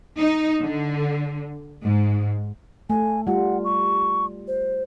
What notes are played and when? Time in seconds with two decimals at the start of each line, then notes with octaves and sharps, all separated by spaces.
0.19 D#4
0.61 D3
1.84 G#2
2.90 A3 G#5
3.27 G3 F4 F#5
3.65 C#6
4.48 C5